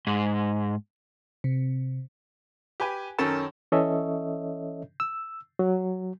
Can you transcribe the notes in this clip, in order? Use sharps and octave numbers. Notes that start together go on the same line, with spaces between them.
G#2
C3
G4 B4 G#5
F#2 D#3 C#4 A4 A#4 A5
E3 C#4 A4 C#5 D#5 E5
E6
F#3